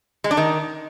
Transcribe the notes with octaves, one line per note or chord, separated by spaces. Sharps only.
G#3
D4
D#3